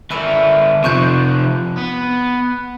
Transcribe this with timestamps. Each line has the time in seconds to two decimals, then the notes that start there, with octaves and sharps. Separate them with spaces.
0.11 D3 A#4 B4 E5
0.84 C3 F3 C#6 F#6 G6
1.77 B3